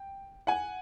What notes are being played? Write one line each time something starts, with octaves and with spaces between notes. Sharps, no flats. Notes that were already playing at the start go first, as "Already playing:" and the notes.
Already playing: G5
F#5 G#5